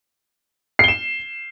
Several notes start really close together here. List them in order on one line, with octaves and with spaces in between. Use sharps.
C7 G7 E7